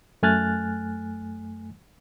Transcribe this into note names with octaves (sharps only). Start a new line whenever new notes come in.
F#2 A3 G#5 F6 F#6 A6